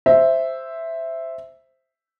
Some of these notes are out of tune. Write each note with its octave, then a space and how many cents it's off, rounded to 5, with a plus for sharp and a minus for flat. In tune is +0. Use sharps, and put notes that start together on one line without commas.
C5 +0 E5 +0